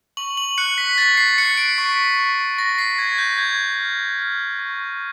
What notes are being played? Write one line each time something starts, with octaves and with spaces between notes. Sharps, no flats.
C#6 F#7
F#7
F#6 C#7
B6
F#6 A6
C7
F#6 C#7
D7
C#6 B6
C#6
C#6 A#6
C7
F#6 G#6
G6
C#6 G#6
F6
F6
C#6